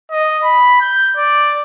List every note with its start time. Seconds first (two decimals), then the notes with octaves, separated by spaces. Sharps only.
0.11 D#5
0.43 B5
0.81 G6
1.17 D5